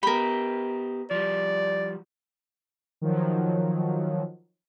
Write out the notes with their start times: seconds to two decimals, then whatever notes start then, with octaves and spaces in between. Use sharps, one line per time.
0.03 B3 G4 A#4 B5
1.11 F3 G3 D5
3.01 D#3 F3 F#3